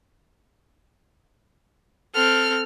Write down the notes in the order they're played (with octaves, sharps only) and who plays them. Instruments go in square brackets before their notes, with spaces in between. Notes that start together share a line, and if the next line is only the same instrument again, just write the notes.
[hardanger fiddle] C4 A4 [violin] F6